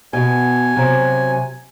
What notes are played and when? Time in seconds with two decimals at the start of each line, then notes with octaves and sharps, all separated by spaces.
0.13 B2 G#5
0.76 C3 F#3